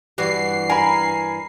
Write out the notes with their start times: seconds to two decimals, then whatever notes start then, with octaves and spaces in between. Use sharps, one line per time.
0.18 G2 E3 F#4 G4 C7
0.69 A#4 G#5 B5